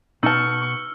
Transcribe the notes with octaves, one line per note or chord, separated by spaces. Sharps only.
B2 B3 D#4 A5 C#6 E6 F6